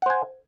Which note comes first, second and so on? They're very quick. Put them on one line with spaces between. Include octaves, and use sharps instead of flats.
F#5 C5 G#5